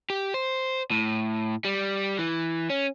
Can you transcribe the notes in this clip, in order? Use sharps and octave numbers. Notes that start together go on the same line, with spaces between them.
G4
C5
A2
G3
E3
C#4